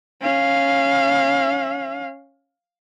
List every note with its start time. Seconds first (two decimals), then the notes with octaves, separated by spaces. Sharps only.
0.21 C#4 F5